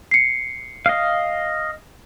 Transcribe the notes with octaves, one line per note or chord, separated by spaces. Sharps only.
C7 C#7
D#5 F5